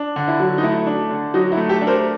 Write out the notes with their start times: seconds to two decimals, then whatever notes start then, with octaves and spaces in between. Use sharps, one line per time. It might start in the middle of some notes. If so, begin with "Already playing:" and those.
Already playing: D4
0.16 D3
0.28 E4
0.40 F#3
0.58 D#4
0.63 A3 E4
0.86 D4
1.10 D3
1.34 F#3 D#4
1.52 E4
1.57 A3
1.69 G4 A4
1.81 D4
1.87 A#4 C5